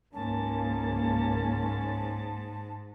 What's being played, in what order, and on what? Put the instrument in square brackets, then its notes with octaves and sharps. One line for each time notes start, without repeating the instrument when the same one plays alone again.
[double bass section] C#2 A#3 [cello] G#2 [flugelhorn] C#4 [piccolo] A5